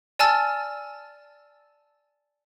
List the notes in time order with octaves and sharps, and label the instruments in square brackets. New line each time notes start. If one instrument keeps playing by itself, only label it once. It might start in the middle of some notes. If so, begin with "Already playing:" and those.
[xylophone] D5 G#5 A5 E6 F6 A6